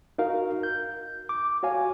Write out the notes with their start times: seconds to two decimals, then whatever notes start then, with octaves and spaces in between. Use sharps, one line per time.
0.18 D#4 F#4 A#4 F5
0.63 G6
1.29 D6
1.63 F#4 C#5 F5 G#5